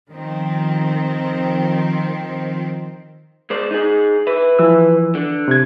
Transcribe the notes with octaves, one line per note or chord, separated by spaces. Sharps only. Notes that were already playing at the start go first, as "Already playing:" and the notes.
D#3 F3 C4
G#3 C5 D5
D#4 G#4
B4 E5
E3 F3 E6
D3
C3 G#6